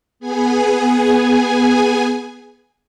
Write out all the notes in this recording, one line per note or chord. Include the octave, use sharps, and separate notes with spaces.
B3 G#4 G#5